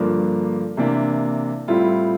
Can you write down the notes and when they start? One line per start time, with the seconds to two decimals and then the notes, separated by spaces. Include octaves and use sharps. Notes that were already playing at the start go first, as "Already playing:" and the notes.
Already playing: G2 D3 F3 A#3 D4
0.77 C3 E3 A#3 D4
1.68 A2 G3 C4 E4 F4